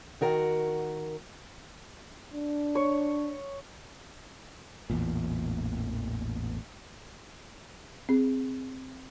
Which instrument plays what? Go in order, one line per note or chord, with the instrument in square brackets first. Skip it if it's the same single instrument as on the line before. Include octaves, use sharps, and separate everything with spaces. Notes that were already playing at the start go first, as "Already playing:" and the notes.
[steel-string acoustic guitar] D#3 F#4 A#4 F#5
[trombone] D4
[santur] C#5
[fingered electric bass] A1 E2 A#2
[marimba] C4 G#4